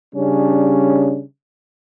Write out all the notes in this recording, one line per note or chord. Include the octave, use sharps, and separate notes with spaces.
C#3 G3 C#4 D4